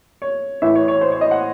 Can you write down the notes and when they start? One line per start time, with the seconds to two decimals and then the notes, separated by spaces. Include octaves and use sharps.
0.22 C#5
0.62 A1 A2 E3 E5
0.75 C#5
0.88 C#5
1.01 C5
1.12 C#5
1.21 D#5
1.31 F#5